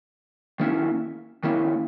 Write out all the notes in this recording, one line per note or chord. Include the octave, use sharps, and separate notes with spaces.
D#3 A#3 C#4 E4
D#3 A#3 C#4 E4